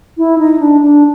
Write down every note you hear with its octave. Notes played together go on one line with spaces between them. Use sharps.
E4
D#4
D4
D4